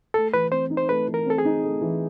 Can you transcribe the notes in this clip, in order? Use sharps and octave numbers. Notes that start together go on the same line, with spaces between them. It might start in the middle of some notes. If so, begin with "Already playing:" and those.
A3 A4
E3 B4
C4 C5
D#4
C5
A3 B4
E3
A#4
C4 A4
G#4
D#4
A3
E3